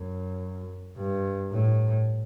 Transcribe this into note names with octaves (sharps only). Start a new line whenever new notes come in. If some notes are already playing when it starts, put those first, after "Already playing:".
Already playing: F#2
G2
A2